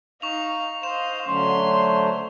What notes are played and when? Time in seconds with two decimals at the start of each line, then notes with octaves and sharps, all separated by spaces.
0.22 D#4 F5 C#6 F7
0.83 C5 D#5 F5 E7
1.27 D3 F#3 A3 C#4 C6
1.68 C5